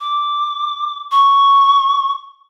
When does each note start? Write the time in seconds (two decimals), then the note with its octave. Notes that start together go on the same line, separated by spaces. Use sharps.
0.01 D6
1.11 C#6